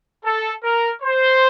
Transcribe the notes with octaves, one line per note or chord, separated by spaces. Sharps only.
A4
A#4
C5